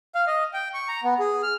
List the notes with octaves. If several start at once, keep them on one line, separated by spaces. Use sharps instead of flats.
F5
D#5
G5
C#6
A#5
B3
G#4
F6